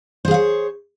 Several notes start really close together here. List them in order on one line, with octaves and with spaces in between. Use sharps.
C5 G#4 F5 C#5